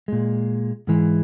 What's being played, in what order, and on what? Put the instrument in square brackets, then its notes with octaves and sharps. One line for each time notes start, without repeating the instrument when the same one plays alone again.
[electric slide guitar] A#2 G#3
G#2 E3 G#3